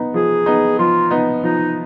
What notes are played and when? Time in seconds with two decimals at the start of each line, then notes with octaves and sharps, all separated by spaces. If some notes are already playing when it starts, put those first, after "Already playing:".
Already playing: B3 D#4
0.14 F3 G#4
0.46 B3 D#4
0.79 F3 F4
1.10 B3 D#4
1.43 F3 D#4